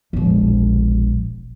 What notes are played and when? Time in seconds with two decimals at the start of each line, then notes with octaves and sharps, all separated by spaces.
0.13 E1 A#1